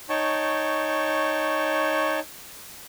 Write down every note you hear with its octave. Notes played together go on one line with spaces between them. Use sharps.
D#4 C#5 G5 A5 C#6